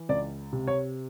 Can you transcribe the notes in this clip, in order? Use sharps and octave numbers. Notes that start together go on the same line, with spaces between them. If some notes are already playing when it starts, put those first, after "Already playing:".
Already playing: E3
C#2 D5
C3
C#5